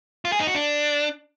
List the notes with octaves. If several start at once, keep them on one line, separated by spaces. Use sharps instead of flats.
F4
G#4
D#4
F#4
D4